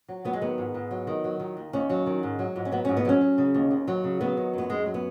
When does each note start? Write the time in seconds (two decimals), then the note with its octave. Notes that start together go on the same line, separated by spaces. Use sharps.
0.08 F#3
0.25 F#3 B3
0.33 G#3
0.41 D#3 B3
0.58 G#2
0.74 G#2
0.91 F#3
1.07 D#3
1.24 F#3
1.40 D#3
1.57 D#2
1.73 D#2 C#4
1.90 F#3
2.06 D#3
2.23 G#2
2.39 F#3
2.56 G#2
2.65 C#4
2.72 F#3 B3
2.85 C#4
2.88 G#2
2.97 B3
3.05 F#3 C#4
3.21 F#3
3.38 C#3
3.54 D#2
3.71 D#2
3.87 F#3
4.04 C#3
4.21 F#3 B3
4.37 D#3
4.53 F#2 B3
4.70 F#2 G#3
4.86 F#3
4.94 B3